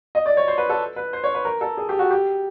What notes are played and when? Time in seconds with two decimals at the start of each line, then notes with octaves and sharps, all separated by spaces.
0.15 D#5
0.26 D5
0.37 C#5
0.48 C5
0.58 B4
0.69 A4
0.96 B4
1.13 C5
1.24 C#5
1.34 B4
1.45 A#4
1.61 A4
1.77 G#4
1.89 G4
1.99 F#4
2.11 G4